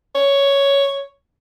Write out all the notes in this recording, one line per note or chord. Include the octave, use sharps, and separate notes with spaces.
C#5